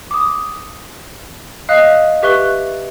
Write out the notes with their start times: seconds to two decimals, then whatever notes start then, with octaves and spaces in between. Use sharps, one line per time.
0.11 D6 D#6
1.69 D#5 F5 D#6 F#6
2.23 G4 B4 E5 C#6 F#6 G7